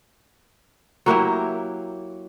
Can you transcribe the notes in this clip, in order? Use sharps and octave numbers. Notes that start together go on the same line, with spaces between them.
F#3 A#3 E4 G4